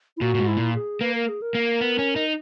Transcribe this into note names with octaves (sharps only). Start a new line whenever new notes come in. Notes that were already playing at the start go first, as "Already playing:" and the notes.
E4
A#2 F#4
A#2
G#2
E4
A#2
G#4
A#3 B4
A#4
G#4
A#4
A#3
B3
C#4
D#4